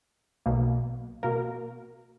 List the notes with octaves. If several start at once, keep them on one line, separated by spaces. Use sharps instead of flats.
B1 B2 A#3
B2 A#3 A#4